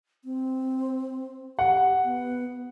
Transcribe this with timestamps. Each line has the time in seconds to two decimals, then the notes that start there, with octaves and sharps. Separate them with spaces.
0.25 C4
1.59 G4 F#5
2.05 B3